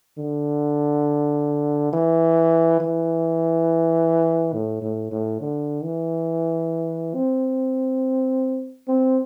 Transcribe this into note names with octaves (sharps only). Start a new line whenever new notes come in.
D3
E3
E3
A2
A2
A2
D3
E3
C4
C4